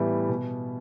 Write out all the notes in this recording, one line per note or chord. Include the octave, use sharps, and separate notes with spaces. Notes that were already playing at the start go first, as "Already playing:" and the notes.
Already playing: A2 E3 G3 B3
B2